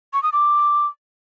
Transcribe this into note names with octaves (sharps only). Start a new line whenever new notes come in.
C#6
D#6
D6